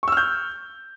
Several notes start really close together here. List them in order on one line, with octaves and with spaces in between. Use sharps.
C#6 E6 F6 G6